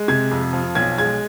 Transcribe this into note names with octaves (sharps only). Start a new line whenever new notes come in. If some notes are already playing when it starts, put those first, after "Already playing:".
Already playing: G#3
C3 G#6
F2
F3
B1 G#6
G#3 G#6